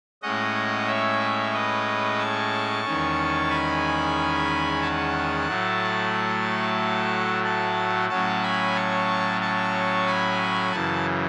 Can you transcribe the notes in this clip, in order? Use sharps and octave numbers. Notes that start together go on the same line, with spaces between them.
A2 G#3 C#4 D#5 F#5
C#5 E5
B4 D#5
A5 C#6
E2 D#3 G#3 C#4
G#5 B5
F#5 A5
A2 F#3 A3
F#5 A5
A2 F#3 C#4 F#5 A5
G#5 B5
A5 C#6
A5 C#6
G#5 B5
F#2 C#3 E3 F#5 A5